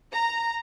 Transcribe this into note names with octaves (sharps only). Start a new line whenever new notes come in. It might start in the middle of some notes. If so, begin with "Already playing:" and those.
A#5